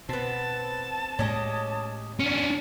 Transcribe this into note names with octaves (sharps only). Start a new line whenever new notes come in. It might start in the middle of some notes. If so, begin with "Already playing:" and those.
B2 B3 C4 A5
A2 G#3 C#4 G4 D#5
C#4 D4 F#4